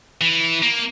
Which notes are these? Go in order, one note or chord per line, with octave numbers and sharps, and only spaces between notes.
E3
A#3